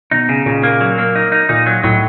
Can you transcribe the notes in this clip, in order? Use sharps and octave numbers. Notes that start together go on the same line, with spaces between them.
B2 D#4
C#3
A#2 C#3
A#3
F#3
A#3
D#4
D#4
A#2 D#4
F#3
A2 F#3